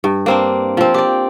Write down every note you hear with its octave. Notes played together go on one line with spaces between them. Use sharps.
G2
A#3 C4 D4
F3 C4
G4 D5